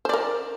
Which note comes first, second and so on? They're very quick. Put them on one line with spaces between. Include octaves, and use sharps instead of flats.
C5 D5 A#4